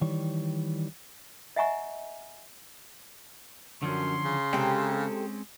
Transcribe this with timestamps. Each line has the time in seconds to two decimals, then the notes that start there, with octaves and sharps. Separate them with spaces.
0.01 D#3 E3 G3 C#5
1.56 D#5 E5 F#5 G#5 A#5 C#6
3.82 F#2 D3 F3 C#4 C6
4.23 C#3
4.53 C3 G#3 C4 C#4 A4